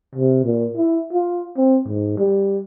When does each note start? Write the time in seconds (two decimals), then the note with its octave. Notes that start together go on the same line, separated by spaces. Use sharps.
0.15 C3
0.45 A#2
0.77 E4
1.13 F4
1.57 C4
1.87 G#2
2.18 G3